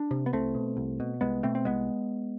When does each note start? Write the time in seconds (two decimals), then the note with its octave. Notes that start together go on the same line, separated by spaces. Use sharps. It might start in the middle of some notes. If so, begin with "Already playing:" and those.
Already playing: D4
0.11 C3
0.26 B3
0.33 C2 A3 C4
0.55 B2
0.77 C2
1.00 B2
1.21 C2 G#3 B3
1.43 B2 A3 C4
1.55 C4
1.65 C2 G#3 B3